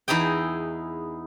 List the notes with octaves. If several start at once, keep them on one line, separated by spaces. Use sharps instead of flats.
E2 D#4 E4 G#4 G5